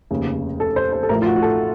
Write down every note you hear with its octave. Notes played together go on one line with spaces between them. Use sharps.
F1 D#2 C#3
A4
C5
C5
A4
A1 A2 F3 A#4
F4
F#4
F#4
A4